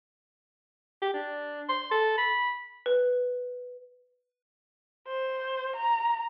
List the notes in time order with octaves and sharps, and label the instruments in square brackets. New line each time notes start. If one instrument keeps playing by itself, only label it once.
[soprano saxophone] G4
D4
C6
A4
B5
[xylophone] B4
[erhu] C5
A#5